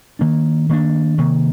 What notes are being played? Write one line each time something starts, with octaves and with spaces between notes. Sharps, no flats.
D#3 A#3 D4
D#3 A#3 D4
C3 D#3 A#3